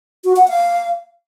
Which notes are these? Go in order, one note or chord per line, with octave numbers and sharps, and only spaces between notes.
F#4
F#5
F5